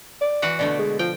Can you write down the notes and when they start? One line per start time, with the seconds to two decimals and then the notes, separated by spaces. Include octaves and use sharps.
0.21 D5
0.42 E3 F#4 F#5
0.59 B2 D3 A3 D5
0.79 G#3
0.99 F3 G5